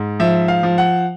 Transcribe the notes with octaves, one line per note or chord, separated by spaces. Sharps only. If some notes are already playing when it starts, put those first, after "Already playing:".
Already playing: G#2
F3 E5
F5
F3
F#5